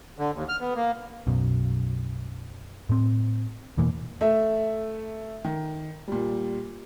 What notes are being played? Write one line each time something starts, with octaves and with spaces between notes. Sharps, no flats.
D3
D#2
F6
B3
A#3
B1 F#2 B2
A2 C4
E2 B2 E3 A#3
A3 E5
D#3
A#2 G3